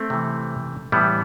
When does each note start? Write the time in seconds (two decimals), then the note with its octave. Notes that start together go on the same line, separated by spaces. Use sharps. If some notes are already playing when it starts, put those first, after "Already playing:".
Already playing: A3 C4
0.10 C3 E3
0.92 A2 E3 G3 B3